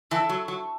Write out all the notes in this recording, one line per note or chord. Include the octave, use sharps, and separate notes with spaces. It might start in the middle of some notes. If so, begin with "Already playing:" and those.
E3 E4 A4 E5 A5
F#3
F#3